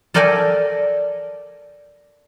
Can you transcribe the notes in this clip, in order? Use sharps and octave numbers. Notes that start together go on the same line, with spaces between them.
A4 A#4 D5 G5 G#5